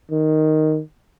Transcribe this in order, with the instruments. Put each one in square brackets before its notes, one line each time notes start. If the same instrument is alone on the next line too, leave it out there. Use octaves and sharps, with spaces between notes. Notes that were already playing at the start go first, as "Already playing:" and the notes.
[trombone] D#3